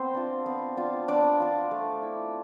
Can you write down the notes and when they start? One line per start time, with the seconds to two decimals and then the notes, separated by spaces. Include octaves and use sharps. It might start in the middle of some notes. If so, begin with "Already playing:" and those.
Already playing: B3 C4 C5
0.15 D4 F4
0.46 B3
0.77 D4 F4
1.08 B3 D4 D5
1.40 D4 F4
1.71 A3
2.02 E4